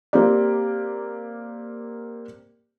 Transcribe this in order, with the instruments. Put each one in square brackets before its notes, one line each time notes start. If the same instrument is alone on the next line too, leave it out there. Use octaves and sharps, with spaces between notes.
[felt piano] A#3 C4 G4 D5